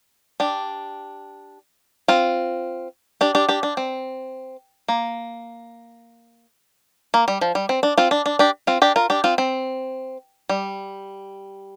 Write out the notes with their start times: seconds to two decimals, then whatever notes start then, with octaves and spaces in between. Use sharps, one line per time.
0.40 D4 G4
2.08 C4 F4
3.21 D4 G4
3.35 D4 G4
3.49 D4 G4
3.63 D4
3.77 C4
4.88 A#3
7.14 A#3
7.28 G3
7.41 F3
7.55 G3
7.69 C4
7.83 D4
7.98 C4 F4
8.11 D4
8.26 D4
8.39 D4 G4
8.67 C4 F4
8.82 D4 G4
8.96 F4 A#4
9.10 D4 G4
9.24 C4 F4
9.38 C4
10.49 G3